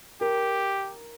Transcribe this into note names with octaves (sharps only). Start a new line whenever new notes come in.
G4 A#4